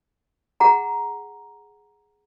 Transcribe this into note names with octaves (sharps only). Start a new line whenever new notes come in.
G#4 F#5 A#5